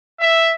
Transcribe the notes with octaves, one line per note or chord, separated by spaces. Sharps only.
E5